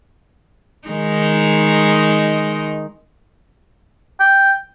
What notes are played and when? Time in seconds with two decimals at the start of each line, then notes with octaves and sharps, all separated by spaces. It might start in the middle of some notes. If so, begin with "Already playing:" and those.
0.88 D#3 G#3 D#4
4.20 G5